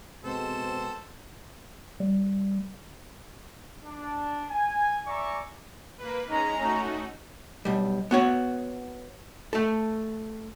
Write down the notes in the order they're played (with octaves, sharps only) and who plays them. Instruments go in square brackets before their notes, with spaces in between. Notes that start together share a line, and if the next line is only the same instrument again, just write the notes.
[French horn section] B2 G#3 C4 [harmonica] A4 C5
[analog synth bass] G3
[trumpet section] D4
G#5
D5 E5 G#5 A#5 C#6 D6
[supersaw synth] A#3 B4
[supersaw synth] G#3 C#4 [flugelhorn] D#4 [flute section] A#5
[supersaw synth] A3 D#4 F#4 [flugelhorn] C#4
[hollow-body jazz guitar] B1 G3
B3 F#4 C#5
A3 A4